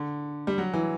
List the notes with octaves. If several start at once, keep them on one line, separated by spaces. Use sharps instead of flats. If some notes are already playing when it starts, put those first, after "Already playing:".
Already playing: D3
G3
F#3
E3